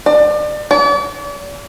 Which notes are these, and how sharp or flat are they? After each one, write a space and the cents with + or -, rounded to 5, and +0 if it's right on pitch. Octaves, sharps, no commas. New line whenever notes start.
D5 +30
D5 -45